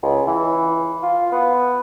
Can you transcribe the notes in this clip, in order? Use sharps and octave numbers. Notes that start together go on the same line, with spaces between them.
C#2
E3
F4
B3